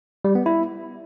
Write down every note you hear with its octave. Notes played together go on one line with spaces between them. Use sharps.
G3
B3
E4